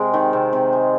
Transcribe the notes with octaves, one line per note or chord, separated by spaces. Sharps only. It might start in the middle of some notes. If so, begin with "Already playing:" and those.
Already playing: C3 G#3 A#4 C5
D#3
C3
C3
G#3